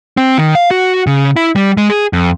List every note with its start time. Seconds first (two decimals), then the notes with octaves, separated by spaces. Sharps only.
0.17 C4
0.38 D#3
0.55 F5
0.71 F#4
1.07 C#3
1.36 E4
1.56 G3
1.77 G#3
1.90 G#4
2.13 F2